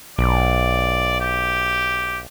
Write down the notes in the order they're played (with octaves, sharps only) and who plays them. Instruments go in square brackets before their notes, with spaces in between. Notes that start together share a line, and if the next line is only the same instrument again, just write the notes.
[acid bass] B1 [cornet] D5
[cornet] G4